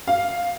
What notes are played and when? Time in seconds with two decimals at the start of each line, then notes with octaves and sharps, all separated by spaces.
0.07 F5